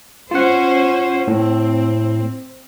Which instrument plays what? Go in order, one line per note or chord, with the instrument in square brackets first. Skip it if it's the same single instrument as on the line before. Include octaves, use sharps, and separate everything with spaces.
[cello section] C#4 C5 [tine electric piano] F4 F#5
[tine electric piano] A2 [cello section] C4